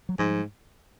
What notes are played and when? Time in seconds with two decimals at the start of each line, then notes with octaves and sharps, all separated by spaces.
0.09 F#3
0.19 G#2 F3 G3